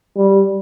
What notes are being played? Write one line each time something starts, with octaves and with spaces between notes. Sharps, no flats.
G3